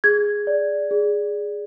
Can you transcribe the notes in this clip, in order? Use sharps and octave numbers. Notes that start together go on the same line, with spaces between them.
G#4 G#6
D5
G#4